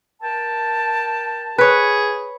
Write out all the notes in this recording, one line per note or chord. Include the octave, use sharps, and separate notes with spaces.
A#4 G5 A5
G#4 B4 C#5